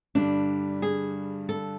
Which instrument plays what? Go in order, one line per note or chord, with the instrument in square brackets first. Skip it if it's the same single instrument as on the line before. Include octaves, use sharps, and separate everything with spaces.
[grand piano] G2 D3 G3 [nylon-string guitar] D4
[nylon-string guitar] G#4
A4